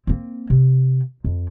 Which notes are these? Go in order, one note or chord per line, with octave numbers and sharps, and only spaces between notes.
A#3 C4
C3
F2